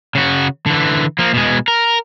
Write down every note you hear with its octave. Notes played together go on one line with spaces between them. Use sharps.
C#3 F#4
D3 E3
F3 A#3
B2 G#3
A#4